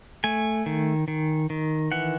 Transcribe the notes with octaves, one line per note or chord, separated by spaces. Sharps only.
A3 G#5
D#3
D#3
D#3
E3 F#5